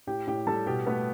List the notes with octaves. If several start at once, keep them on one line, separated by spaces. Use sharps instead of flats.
A2 G4 G5
A2 G4 G5
G3 A4 A5
B2 G4 G5
A3 B3 B4